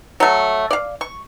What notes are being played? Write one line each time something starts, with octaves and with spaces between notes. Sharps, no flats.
F#3 A3
D5 F5
C#6